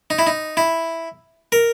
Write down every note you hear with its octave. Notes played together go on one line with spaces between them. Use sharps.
D#4
E4
D#4
E4
A#4